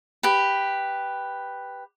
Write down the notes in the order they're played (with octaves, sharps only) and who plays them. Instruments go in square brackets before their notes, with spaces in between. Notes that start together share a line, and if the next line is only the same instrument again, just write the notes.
[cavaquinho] G4 B4